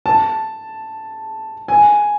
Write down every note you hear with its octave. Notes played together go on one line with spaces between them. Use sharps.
A5
G#5